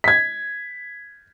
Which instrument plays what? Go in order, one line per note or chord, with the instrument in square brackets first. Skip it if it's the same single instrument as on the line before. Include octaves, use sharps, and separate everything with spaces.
[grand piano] G#6 B6